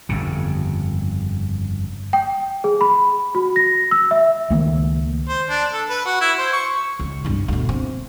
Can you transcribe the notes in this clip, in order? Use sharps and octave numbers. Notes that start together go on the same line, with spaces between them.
G1 F2 C#3
G5
G#4
B5
F#4
A#6
E6
E5
C#2 D#3 A3 A#3
C5
D4
A4
B4
F#4
E4
C5
C#6
C#2
C2 G2
D2 B2
C4